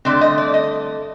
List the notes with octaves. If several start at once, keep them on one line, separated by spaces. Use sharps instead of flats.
G2 D3 A3 C4 D5
D#5
D5
D#5